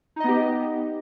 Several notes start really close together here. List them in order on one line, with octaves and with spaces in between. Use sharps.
D#4 D#5 B3 G4